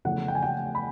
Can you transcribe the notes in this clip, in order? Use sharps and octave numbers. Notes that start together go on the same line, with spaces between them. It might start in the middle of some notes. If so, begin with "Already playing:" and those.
E2 C#3 F3 A3 F#5
G5
G#5
G5
B5